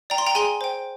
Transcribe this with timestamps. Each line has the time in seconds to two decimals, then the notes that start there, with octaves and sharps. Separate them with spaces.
0.10 D5 G5 A#5
0.18 C6
0.26 G5 A#5
0.35 G#4 G#5 C6
0.61 C5 G5